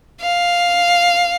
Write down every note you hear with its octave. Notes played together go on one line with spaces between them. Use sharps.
F5